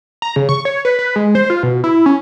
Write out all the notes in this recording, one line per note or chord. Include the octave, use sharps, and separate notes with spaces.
A#5
C#3
C#6
C#5
B4
B4
G#3
C5
F4
B2
E4
C#4